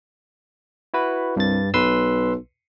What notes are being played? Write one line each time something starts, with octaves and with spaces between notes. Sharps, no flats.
E4 F#4 B4
C2 G2 A6
B1 B4 C6 E6